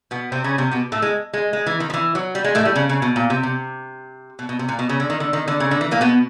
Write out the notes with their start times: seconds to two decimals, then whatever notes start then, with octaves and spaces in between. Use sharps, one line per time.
0.11 B2 B3
0.32 C3 C4
0.44 C#3 C#4
0.58 C3 C4
0.71 B2 B3
0.92 A2 A3
1.02 G#3
1.33 G#3
1.53 G#3
1.66 E3
1.80 D#3
1.90 F3
1.94 E3
2.15 F#3
2.35 G3
2.44 G#3
2.55 A2 A3
2.65 G3
2.75 C#3
2.89 C#3
3.02 B2
3.16 A#2
3.30 C3
3.43 C3
4.39 B2
4.49 B2
4.59 C3
4.69 A#2
4.79 B2
4.89 C#3
5.00 D3
5.10 D#3
5.20 D3
5.33 D#3
5.48 D3
5.60 C#3
5.71 D3
5.81 E3
5.91 A#2 A#3
6.01 B2 B3